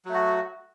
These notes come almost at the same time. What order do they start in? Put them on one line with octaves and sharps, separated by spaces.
F#3 A3 F#4